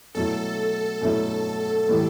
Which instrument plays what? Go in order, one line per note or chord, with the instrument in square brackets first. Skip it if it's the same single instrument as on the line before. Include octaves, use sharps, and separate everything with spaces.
[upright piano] B2 F#3 A3 E4 [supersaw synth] A4
[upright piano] B2 F#3 A3 E4
A2 E3 G3